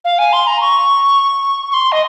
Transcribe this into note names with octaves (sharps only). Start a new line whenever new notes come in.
F5
G#5
C6
A#5
C#6
C#6
C6
D#5